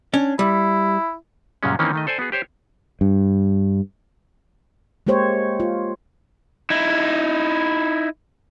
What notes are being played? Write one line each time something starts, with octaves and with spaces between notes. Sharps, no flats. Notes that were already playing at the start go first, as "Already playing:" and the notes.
C#4 D4
G3 E4
F#2 A#2 C#3 G3 G#3 C#4
D#3 E3 A#3 C4 C#4 D#4
D#3 A3 D#5
A4 C5 D5 G#5
B3 F#4 G#4
G4 C5 C#5
G2
G#3 A#3 G4 C5 C#5
F4
D#4 E4